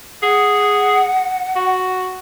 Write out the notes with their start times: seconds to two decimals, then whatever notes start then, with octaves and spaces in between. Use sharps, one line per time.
0.23 G#4 F#5
1.56 F#4